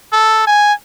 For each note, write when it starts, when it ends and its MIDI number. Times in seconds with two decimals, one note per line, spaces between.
0.13 0.46 69
0.47 0.73 80